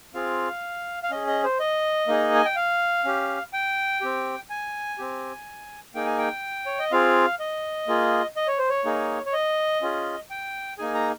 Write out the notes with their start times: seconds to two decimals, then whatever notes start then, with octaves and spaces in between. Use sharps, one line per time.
0.14 C4 F4 G#4 F5
1.03 F5
1.11 C#4 G#4 D#5
1.27 D#5
1.44 C5
1.60 D#5
2.08 A#3 D#4 G#4
2.35 G#5
2.45 G5
2.56 F5
3.05 C#4 G4
3.53 G5
4.01 C4 G4
4.50 G#5
4.98 C4 G4
5.95 A#3 D#4 G#4 G5
6.06 G#5
6.18 G5
6.66 C#5
6.79 D#5
6.92 C4 F4 G#4 F5
7.40 D#5
7.88 A#3 F4 G#4
8.36 D#5
8.48 C#5
8.58 C5
8.69 C#5
8.85 A#3 D#4 G#4
9.26 C#5
9.33 D#5
9.82 C#4 F4 G#4
10.30 G5
10.78 A#3 D#4 G#4 G#5
10.95 A#5